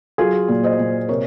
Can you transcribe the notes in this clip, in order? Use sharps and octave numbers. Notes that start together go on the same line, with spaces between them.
F#3 F4 G#4
A#2
C5 D#5
A#2
C3 A#4 C#5